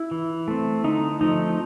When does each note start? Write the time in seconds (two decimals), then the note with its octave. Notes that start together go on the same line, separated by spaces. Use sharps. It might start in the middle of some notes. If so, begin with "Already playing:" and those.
Already playing: E4
0.11 E3
0.48 A3 C4
0.84 D3 D#4
1.21 F3 A3 C4 D#4